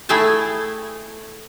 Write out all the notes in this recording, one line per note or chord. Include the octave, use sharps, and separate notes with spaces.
A3 E4 G#4 E5 G5 A5